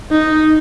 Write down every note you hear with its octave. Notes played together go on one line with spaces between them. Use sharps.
D#4